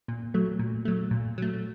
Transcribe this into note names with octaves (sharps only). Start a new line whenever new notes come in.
A#2
F#3 A3
A#2
F#3 A3
A#2
F#3 A3